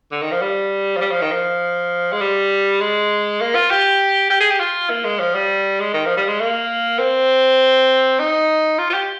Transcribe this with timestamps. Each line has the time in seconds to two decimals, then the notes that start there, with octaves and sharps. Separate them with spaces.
0.12 D3
0.22 D#3
0.31 F3
0.42 G3
0.97 F3
1.01 G3
1.11 F3
1.21 D#3
1.31 F3
2.13 G#3
2.21 G3
2.81 G#3
3.41 A#3
3.55 F4
3.71 G4
4.30 G4
4.40 G#4
4.50 G4
4.60 F4
4.90 A#3
5.04 G#3
5.19 F3
5.35 G3
5.80 G#3
5.94 D#3
6.06 F3
6.17 G3
6.28 G#3
6.40 A#3
6.99 C4
8.19 D#4
8.79 F4
8.90 F4
8.94 G4